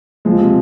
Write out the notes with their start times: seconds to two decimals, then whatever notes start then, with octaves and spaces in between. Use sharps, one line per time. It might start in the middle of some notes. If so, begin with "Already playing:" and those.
0.25 F3 G#3
0.40 C3